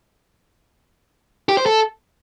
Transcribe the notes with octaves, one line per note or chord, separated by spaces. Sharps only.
G4
C5
A4